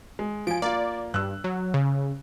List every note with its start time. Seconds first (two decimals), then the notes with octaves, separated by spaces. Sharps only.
0.19 G#3
0.47 F3 G#5 D7
0.62 A#3 F4 D5
1.14 G2 E6 F#6
1.44 F#3
1.74 C#3